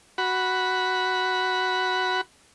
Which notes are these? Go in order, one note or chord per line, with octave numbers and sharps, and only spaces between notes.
F#4 B5